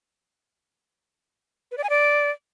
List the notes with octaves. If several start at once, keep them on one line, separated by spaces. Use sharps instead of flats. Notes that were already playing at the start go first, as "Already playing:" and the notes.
B4
D5
G#5
D5